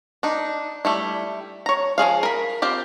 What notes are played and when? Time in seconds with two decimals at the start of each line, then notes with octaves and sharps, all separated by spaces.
0.23 D4 D#4
0.85 G3 A3 E4
1.66 C#5 A#5
1.98 F3 F4 G#4 F5
2.23 A#4 B5
2.62 C4 F4 G4